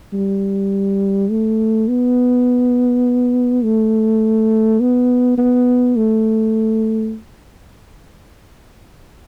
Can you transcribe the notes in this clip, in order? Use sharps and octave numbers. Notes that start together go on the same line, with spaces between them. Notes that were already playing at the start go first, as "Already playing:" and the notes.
G3
A3
B3
A3
B3
B3
A3